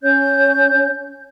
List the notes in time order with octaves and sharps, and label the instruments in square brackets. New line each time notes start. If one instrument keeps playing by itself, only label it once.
[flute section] C#4 C#5 G6